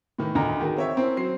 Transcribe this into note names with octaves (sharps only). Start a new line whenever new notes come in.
A2 D#3 E3
D2 D#4 A#5
D#3 F#4 G#4
C4 C#5 E5
C4 C#4 E4 A#4
F#3 C5 C7